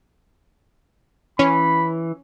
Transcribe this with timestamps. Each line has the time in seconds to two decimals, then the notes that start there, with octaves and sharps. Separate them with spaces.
1.39 E3 C#4 B5